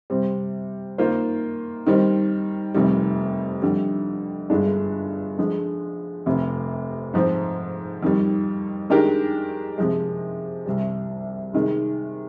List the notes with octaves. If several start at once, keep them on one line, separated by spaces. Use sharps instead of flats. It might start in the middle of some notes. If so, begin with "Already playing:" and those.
C3 G3 C4
D#3 A#3 F4 C5
D#3 G3 C4 D#4
F1 F2 C3 D#3 G3
F2 D3 G3
G1 G2 D3 G#3 D4
D3 F3 G#3
F1 F2 C3
G#2 F3 C4
F2 D#3 G3
D#3 G#3 D4 G4 A#4
C3 F3 G#3
C2 C3 G3
C3 D#3 G#3